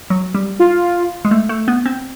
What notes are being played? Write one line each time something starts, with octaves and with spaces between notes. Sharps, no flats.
F#3
G3
F4
G#3
A3
A3
B3
C4